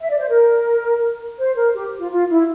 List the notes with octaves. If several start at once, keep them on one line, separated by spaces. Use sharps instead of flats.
E5
D5
C5
A#4
C5
A#4
G4
F4
F4
E4